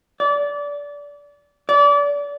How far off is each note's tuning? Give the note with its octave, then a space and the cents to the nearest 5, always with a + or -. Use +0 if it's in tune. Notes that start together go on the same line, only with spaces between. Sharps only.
D5 -25
D5 -30